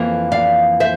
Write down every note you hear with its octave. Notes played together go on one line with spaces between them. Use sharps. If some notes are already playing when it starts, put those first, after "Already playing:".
Already playing: F2 E3 A#3
D5 F5
C5 E5